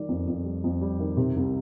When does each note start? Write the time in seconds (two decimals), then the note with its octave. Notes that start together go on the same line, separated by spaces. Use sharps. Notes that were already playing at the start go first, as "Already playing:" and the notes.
Already playing: D#3 G3 D5
0.09 F2
0.27 F2
0.44 G3
0.64 F2
0.81 G3
0.99 D#3
1.17 C3
1.36 C2